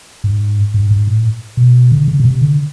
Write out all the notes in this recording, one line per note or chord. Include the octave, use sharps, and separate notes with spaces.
G#2
G#2
G#2
A2
B2
D3
C#3
B2
C3
D3